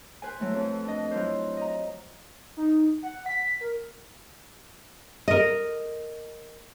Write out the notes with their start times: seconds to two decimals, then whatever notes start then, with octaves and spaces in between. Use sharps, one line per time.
0.22 B4 C5 G#5
0.39 F#3 A3 E4
0.53 F2
0.84 D4 D#5
1.11 F#3 E4 F4 C5
1.57 D#5 A#5
2.57 D#4
3.03 F#5
3.26 B6
3.61 A#4
5.28 A#4 D#5